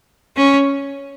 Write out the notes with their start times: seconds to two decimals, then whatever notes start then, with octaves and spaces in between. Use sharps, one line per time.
0.36 C#4